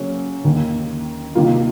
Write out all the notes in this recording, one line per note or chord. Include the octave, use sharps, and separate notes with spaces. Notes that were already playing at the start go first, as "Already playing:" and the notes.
Already playing: C#3 F#3 A#3 C#4
D#2 D#3 A#3
C3 D#3 A#3 F4